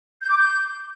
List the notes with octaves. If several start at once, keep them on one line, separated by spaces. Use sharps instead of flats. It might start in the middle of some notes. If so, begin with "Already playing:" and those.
G6
D6
G6